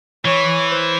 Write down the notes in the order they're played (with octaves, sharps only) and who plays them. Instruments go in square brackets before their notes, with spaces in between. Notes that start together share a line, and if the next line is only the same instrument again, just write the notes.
[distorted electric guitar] E3 [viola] C#5
[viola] C5